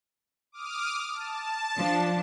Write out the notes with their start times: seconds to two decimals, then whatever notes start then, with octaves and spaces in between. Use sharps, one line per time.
0.52 D6 D#6 F6
1.14 A5
1.76 F3 D4